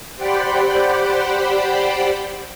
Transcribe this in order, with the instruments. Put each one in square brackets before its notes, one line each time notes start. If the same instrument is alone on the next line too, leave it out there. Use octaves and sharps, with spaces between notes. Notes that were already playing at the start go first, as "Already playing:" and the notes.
[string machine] G4 C5 D5 F#5 G5 B5